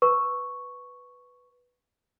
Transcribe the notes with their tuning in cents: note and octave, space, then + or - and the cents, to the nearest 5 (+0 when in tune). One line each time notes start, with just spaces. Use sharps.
B4 +0 C#6 +0